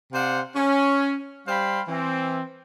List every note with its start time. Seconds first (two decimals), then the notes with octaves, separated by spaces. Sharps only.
0.13 C3 C5 D5 F5 F#5
0.54 C#4
1.47 G3 C5 F5 G5 B5
1.88 E3 C4